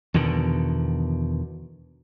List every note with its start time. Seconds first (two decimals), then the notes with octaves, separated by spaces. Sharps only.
0.14 E2 B2 D3 D#3